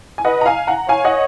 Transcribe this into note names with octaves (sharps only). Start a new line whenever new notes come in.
G#5
B4 D#5 F#5
A#5
F5 G#5
F#5 A#5
C#5 F5 G#5
D#5 F#5